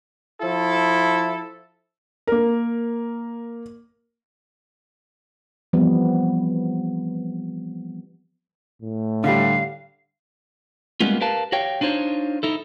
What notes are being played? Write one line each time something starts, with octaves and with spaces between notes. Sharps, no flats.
F3 E4 A4
A#3 A#4
E3 F3 G3 B3 C4
A2
D3 G3 F5
G3 G#3 A#3 B3 C#4 F4
G4 A#4 B4 F5 A5
F#4 G4 C#5 F5 G5
D4 D#4 F4 C5 C#5
D#4 E4 A4